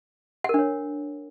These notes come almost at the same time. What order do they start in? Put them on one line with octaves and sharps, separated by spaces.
F#5 A#4 D4 C#5